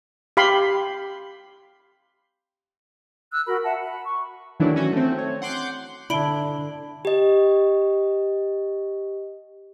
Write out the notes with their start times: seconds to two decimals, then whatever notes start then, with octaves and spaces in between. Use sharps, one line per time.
0.37 G4 F5 B5 C6
3.31 E6 F#6
3.46 F#4 A#4 B5
3.64 E5 F#5 A5
3.79 B5
4.06 C#6
4.60 D#3 E3 F#3 A3 D4 E4
4.76 C#4 F#4
4.93 A3 C4
5.18 C#5
5.42 F#5 C6 D6 G6
6.10 D3 D4 E4 D5 A5 B5 D7 G7
7.05 G4 D#5